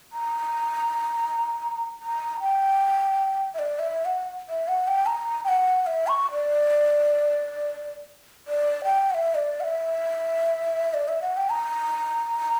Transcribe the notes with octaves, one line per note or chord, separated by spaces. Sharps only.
A#5
A#5
G5
E5
D5
E5
F#5
E5
F#5
G5
A#5
G5
F#5
F#5
E5
C#6
D5
D5
G5
F#5
E5
D5
F#5
E5
D5
E5
F#5
G5
A#5